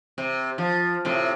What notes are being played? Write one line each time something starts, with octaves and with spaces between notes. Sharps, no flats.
C3
F3
A2 C3